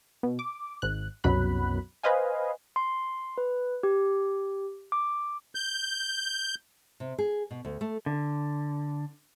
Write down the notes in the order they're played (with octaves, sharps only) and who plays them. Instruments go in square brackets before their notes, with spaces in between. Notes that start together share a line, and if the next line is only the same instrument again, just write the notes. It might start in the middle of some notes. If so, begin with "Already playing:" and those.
[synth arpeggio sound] B2
D6
G#1 G#2 F#6
C2 F#2 B2 F#3 B5 F#6
B4 C5 D#5 F5 G#5
[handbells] C6
B4
G4
D6
[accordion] G6
[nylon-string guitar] C3
G#4
B2
D2
A3
[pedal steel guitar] D3